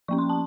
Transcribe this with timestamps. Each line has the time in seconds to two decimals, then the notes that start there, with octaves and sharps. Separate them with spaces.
0.08 F3 A#3 C#4 C#6
0.18 C6
0.30 A5